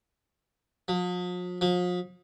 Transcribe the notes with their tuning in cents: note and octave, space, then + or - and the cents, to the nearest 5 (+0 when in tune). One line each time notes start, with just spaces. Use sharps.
F3 +45
F3 +40